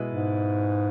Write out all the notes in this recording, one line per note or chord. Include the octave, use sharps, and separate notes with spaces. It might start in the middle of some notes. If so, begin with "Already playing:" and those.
Already playing: B2 G#3 E4 B4
G#2